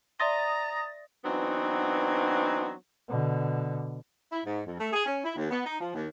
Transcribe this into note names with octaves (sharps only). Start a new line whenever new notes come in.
D5 E5 A#5 C6 D#6 A6 A#6
E3 F#3 B3 C4 D4 D#4
B2 D3
E4
G#2
F2
A3
G#4
C#4
E4
D#2
B3
D#4
F3
D#2